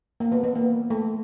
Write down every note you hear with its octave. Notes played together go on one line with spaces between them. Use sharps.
A#3
B3
B3
A#3
A3